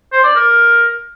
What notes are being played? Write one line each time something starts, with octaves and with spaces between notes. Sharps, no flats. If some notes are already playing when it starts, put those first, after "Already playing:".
C5
D5
A#4